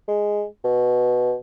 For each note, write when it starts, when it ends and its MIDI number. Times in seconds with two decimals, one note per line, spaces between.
0.08 0.45 56
0.64 1.35 47